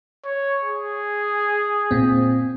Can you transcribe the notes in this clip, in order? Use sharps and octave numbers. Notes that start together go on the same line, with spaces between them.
C#5
G#4
A#2 C4